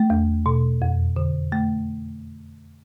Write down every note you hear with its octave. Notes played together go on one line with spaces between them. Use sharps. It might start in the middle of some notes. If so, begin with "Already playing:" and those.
Already playing: A3
E2
B2
F2
D3
A3